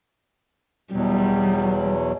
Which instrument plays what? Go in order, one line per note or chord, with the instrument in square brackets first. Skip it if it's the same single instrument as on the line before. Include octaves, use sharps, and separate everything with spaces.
[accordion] E2 B2 F#3 [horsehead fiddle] G3